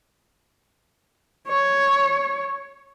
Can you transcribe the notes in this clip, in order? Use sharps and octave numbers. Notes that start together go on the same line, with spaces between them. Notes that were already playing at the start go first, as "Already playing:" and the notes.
C#5